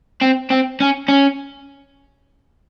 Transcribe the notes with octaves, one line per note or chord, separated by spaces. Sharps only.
C4
C4
C#4
C#4